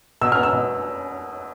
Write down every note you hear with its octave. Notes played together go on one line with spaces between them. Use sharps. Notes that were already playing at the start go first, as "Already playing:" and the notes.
B2 E6
B3 F6
E6
B2